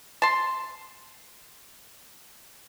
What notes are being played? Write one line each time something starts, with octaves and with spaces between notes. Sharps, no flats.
A5 C6